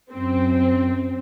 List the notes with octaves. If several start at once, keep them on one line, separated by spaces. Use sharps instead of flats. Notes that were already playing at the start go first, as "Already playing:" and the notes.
F#2 C4